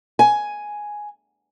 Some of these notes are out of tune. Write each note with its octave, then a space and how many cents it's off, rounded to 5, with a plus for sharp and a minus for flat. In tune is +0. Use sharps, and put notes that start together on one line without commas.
G#5 +5